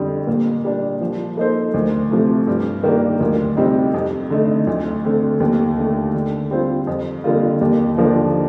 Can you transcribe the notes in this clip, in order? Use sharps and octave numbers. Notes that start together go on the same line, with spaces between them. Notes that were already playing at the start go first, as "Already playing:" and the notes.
Already playing: F2 D3 G3
A#2
G3 D4
F3
A#3 D#4 A4 C5
D2
C3 F3 A3
G2
D#3 A#3 D4 G4
D2
C3 G3 C4 D#4
F2
D3 A3 D#4
D2
D3 A3 C4
D#2
D3 A3
D3
G3 C4 F4 C5
F2
D3 G3 A#3 F4
D#2
D3 F3 A#3 D4